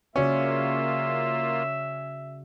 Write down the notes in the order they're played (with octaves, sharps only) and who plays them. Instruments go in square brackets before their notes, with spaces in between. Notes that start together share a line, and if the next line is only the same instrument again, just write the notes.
[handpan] C#3 F#4 D5 [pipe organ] A#3 F4 [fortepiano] C#4 [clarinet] E5